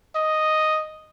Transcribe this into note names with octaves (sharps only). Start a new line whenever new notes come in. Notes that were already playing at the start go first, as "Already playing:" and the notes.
D#5